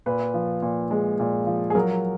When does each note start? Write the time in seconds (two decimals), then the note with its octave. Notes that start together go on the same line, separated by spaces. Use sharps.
0.06 A#2 B4
0.34 F3
0.62 A#2
0.91 G#3
1.19 A#2
1.46 F3
1.70 G#4
1.75 F#3 A#4